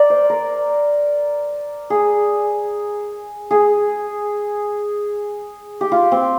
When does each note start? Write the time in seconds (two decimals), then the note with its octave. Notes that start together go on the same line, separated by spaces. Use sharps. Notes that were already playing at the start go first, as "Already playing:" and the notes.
Already playing: A#4 D5
0.10 C5
0.30 A#4
1.90 G#4
3.51 G#4
5.81 G4
5.92 F4
6.12 C4